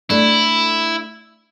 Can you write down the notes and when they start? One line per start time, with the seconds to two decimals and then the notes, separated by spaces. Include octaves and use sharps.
0.10 A3 D4 E4